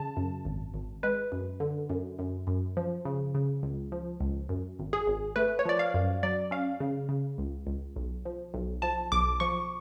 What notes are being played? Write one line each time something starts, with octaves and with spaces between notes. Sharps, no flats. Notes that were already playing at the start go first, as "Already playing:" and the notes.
Already playing: C#3 A5
F#2
G#1
G#1
G#3 B4
F#2
D3
F#2
F#2
F#2
F3
C#3
C#3
C#2
F3
C#2
F#2
G#1
G#4
G#1
A3 B4
C#5
F3 D5
F5
F#2
F#3 D5
C#4 F5
C#3
C#3
C#2
C#2
B1
F3
B1
F3 A5
B1 D6
F3 C#6